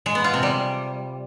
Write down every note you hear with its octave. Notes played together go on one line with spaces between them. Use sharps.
G#3
B3
F4
C3
G3